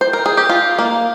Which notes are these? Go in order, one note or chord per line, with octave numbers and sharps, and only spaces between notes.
C5
A#4
G#4
G4
F4
A#3